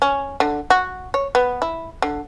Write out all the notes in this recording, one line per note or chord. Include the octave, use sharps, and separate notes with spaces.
C#4
D3
F#4
C#5
B3
E4
D3